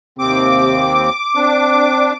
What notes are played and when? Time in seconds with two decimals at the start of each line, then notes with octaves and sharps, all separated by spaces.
0.18 D#2 C3 C4 D6
1.36 C4 D4